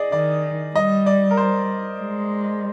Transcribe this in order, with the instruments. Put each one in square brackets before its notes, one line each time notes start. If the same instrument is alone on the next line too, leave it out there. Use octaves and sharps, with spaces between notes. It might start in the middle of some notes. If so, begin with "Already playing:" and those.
Already playing: [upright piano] G#4 D5 D#5
[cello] D#3 [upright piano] D5
[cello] G3 [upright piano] D#5
[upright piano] D5
A#4
C5
[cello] G#3